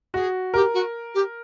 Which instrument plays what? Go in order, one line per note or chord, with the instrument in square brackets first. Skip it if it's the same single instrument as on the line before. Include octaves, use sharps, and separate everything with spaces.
[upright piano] F#4 [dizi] G#4
[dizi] G4 [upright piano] A#4
[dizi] F#4
G4